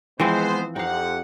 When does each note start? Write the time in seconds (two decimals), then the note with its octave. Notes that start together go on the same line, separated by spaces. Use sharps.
0.20 E3 F3 G#3 B3 C4 C5
0.76 F2 D#4 G4 F5 F#5